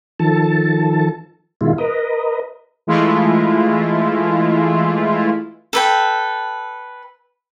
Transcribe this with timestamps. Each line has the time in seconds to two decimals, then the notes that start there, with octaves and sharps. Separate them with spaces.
0.20 D#3 F3 A4 A5
1.61 B2 D#3 G#3 E4 F4
1.78 A#4 B4 D#5
2.87 E3 G#3 A3 E4 F4
5.73 A4 B4 G5